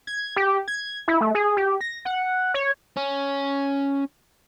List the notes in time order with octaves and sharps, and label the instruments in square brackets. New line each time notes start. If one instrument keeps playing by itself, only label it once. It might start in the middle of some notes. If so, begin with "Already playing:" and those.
[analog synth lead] G#6
G4
G#6
E4
A3
G#4
G4
A#6
F#5
C#5
[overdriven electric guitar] C#4